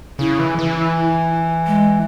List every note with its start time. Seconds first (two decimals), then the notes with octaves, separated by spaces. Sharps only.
0.19 C#3 E4
0.39 E3
0.59 E3
1.67 G#3